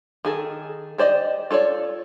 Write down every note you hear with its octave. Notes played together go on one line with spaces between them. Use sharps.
D#3 G#4 A4
G4 C5 D5 D#5
F4 A4 C#5 D5